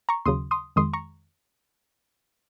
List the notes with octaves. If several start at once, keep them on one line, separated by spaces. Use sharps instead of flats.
A#5 C#6
D#2 C#3 F#3 C6 D#6
C6 D#6
F2 D#3 G#3 C6 D#6
A#5 C#6